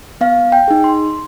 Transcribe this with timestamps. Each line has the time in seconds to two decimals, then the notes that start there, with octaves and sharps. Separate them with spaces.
0.21 B3 F5
0.52 G5
0.68 D#4 G#4
0.84 C6